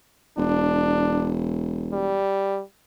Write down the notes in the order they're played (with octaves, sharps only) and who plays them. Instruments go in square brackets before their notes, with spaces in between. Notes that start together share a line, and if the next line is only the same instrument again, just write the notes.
[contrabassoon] E1 [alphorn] D4
[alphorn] G3